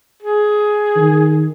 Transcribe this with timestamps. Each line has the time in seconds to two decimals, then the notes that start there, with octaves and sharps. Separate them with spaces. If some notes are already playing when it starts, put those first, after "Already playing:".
0.22 G#4
0.96 D#3